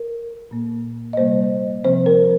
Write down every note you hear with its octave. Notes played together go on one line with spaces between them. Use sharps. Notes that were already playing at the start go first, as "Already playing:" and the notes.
Already playing: A#4
A#2 A#3
D#5
C3 G3 A#3 C5
C3 F3 C4 C5
A#4